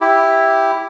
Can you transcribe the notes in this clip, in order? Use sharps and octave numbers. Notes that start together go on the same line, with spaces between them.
E4 G4